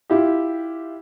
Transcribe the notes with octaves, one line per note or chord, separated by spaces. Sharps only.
E4 F4 G4